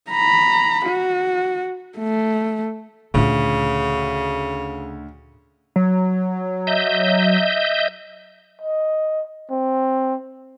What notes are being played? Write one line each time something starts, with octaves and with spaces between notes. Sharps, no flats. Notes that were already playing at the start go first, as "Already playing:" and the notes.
A#5 B5
F#4
A3
D2 A#2 C#3 F4
F#3
D#5 E5 G6
D#5
C4